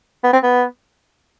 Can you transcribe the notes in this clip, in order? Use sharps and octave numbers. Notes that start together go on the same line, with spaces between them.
B3
C4
B3